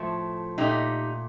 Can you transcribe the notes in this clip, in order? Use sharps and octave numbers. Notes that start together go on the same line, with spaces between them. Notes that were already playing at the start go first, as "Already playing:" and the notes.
Already playing: A2 F3 A3
A#2 A3 D#4 G4